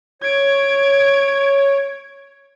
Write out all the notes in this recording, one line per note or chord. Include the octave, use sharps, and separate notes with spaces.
C#5 G#6 D7